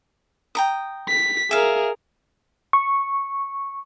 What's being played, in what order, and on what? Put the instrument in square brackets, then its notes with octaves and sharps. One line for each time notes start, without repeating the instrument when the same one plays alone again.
[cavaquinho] G5 A#5 D#6
[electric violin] B6
[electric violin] G#4 A#4 [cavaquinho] E5 F5
[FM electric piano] C#6